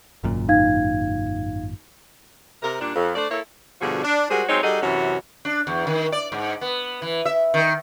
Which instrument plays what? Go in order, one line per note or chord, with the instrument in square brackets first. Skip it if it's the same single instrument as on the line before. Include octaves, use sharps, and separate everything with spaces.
[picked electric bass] G#1 F#2 A#2
[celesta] D#4 F5 G#6
[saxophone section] C3 A#4
A#2 G3 D4
F2
A3 D4 C5 D5
A#3 E4 A4 C#5 E5
G2 B2 D3 F3 F#4 G#4
D4
G3 G#3 F#4 G#4 A#4 C5
F#3 G#3 C4 D#4 C5 C#5
G3 D#4 F#4 G#4 A4 D#5
F#2 C3 E3 C#4 F#4
[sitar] D4
E2
D#3
D5
G#2
B3
E3
E5
D#3